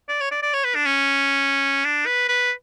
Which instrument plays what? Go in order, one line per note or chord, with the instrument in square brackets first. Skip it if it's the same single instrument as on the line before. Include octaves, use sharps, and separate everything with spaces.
[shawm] D5
C#5
D5
D5
C#5
B4
D4
C#4
D4
B4
B4